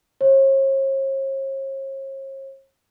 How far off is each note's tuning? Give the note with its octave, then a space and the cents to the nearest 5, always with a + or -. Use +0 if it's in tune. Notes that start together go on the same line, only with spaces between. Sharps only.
C#5 -45